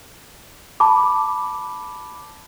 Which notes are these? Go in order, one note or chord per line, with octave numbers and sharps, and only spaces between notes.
A5 B5 D6